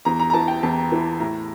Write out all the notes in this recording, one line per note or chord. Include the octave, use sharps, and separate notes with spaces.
E2 A#5
A#5
A#5
E3 A5
G5
E2 A5
E3
A2 A#5